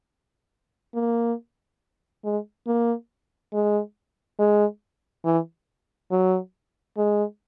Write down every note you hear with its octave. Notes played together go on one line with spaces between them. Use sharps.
A#3
G#3
A#3
G#3
G#3
E3
F#3
G#3